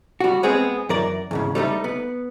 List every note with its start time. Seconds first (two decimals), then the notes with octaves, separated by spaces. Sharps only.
0.20 G3 F#4
0.43 G#3 B3 C4 G#4
0.89 F#2 E3 A#4 D5
1.31 E2 G#2 C#3
1.55 G3 A3 C4 D#4
1.84 B3